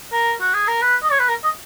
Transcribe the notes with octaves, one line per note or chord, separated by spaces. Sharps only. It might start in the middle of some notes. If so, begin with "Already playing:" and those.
A#4
F#4
G#4
A#4
B4
D#5
C#5
B4
A#4
D#5